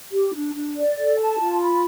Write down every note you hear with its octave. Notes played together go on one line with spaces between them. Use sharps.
G4
D4
D4
D5
A4
A5
F4
B5